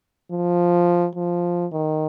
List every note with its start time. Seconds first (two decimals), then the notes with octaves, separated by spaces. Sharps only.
0.31 F3
1.15 F3
1.72 D#3